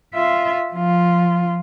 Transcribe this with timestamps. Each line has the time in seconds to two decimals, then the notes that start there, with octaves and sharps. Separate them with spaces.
0.14 F4 E5
0.73 F3 F4